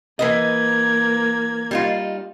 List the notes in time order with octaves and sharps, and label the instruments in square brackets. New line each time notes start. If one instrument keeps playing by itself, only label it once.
[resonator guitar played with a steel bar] E3 B4 D#5 [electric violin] A#3 G#6
[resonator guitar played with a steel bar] G3 D#4 F4